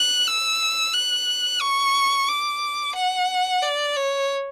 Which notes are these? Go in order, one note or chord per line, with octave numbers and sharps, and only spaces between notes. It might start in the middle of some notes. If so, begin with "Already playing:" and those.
Already playing: F#6
E6
F#6
C#6
D6
F#5
D5
C#5